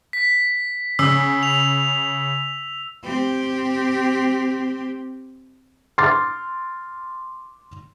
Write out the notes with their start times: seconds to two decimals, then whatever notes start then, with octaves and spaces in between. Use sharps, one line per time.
0.13 B6
0.99 C#3 E6
1.43 F7
3.04 C4 G4
5.98 C6 D6 F6 A6